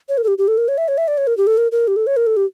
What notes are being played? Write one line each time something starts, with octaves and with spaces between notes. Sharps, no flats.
C#5
A#4
A4
G4
G4
A4
A#4
C#5
E5
C#5
E5
D5
C#5
A#4
G4
A4
A#4
A#4
G4
A4
C#5
A#4
A4
G4